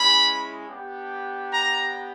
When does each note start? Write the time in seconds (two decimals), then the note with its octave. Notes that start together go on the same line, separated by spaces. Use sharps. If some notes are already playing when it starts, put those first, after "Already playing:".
Already playing: G#3 C#4 E4 B5
0.67 B3 D4 G4
1.53 A#5